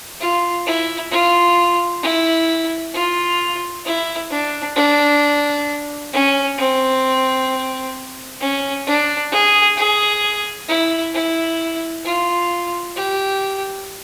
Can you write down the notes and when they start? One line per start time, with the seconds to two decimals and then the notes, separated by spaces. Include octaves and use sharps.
0.20 F4
0.66 E4
1.11 F4
2.03 E4
2.93 F4
3.85 E4
4.30 D4
4.76 D4
6.13 C#4
6.58 C4
8.40 C#4
8.87 D4
9.32 G#4
9.77 G#4
10.68 E4
11.14 E4
12.05 F4
12.96 G4